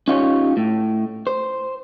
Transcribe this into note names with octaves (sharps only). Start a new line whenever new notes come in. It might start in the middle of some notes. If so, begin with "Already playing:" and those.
C#4 D#4 F4 G4 C#5
A2
C5